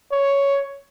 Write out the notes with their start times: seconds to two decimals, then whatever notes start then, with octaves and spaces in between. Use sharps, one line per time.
0.13 C#5